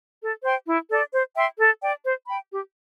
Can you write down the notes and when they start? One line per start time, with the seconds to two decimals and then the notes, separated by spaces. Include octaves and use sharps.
0.21 A4
0.43 C5 G5 C6
0.66 E4
0.89 A4 D5
1.12 C5
1.35 E5 G5 C6
1.58 A4
1.81 D5 G5
2.03 C5
2.26 G5 B5
2.49 G4